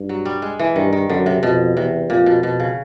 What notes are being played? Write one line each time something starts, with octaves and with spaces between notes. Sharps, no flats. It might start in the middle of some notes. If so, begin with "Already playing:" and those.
Already playing: G2
F#3
G3
G#3
E3
G2 D#3
D#3
F#2 D3
C3
F2 B2
E2 C3
F2 A#2
B2
B2
C#3